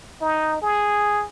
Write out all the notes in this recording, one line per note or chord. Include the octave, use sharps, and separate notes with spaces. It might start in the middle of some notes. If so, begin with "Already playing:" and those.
D#4
G#4